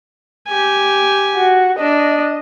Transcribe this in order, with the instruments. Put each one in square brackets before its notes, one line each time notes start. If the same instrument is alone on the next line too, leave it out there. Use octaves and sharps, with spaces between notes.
[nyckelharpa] G4 G#5
[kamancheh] F#4
[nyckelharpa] D4 [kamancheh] D#5